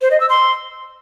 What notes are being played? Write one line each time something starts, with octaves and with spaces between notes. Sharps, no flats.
C5
D#5
E6
C6